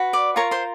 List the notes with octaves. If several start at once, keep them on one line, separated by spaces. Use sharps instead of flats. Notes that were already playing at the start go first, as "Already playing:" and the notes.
Already playing: F#4 B4
D5 D6
F4 A#4 C#5 C#6
C5 C6